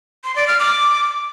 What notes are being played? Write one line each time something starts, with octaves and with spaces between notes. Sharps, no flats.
C6
D5
F6
D6